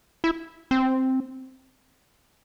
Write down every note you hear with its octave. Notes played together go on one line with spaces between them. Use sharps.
E4
C4